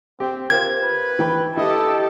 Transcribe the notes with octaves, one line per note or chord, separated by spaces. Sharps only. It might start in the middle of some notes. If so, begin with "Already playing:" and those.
C4 G4
F4 G4 A#4 C5 G#6
B4
E3 G5 B5
E4 G4 A4 D#5